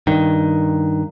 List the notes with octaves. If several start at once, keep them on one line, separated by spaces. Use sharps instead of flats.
G2 D#3